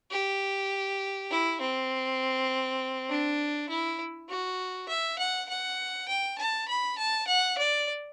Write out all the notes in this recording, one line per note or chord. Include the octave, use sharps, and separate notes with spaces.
G4
E4
C4
D4
E4
F#4
E5
F#5
F#5
G5
A5
B5
A5
F#5
D5